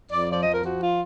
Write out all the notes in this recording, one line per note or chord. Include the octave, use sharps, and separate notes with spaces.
F2 D5
F3 D5
D#5
F2
A#4
F3 F#4
F4